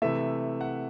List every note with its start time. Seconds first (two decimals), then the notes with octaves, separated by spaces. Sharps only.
0.02 C3 E3 A3 E5
0.61 F#5